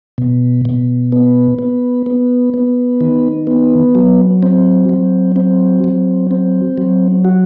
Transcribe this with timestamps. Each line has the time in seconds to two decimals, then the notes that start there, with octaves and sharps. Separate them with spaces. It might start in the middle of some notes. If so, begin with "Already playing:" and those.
0.18 B2
0.65 B2
1.12 B3
1.59 B3
2.06 B3
2.54 B3
3.01 D#3
3.47 B3
3.95 F#3
4.43 C4
4.89 F#3
5.36 C4
5.84 F#3
6.31 C4
6.78 F#3
7.25 F#4